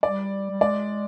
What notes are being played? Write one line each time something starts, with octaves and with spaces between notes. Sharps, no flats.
G3 D5
G3
G#3 D5